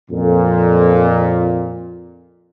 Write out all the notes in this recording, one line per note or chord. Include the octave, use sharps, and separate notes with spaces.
F2 A#2